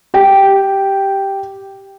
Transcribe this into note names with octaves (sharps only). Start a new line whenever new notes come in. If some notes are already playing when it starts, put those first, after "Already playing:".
G4 G5